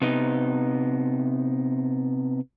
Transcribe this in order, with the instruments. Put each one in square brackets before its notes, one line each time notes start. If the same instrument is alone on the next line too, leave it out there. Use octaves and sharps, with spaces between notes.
[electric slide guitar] C3 B3 D#4